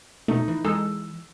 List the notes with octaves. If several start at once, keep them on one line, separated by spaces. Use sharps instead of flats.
B2 A3 D#4
E3
G#3 D#4 A4 E6